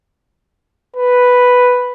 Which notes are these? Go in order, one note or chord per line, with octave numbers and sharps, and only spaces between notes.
B4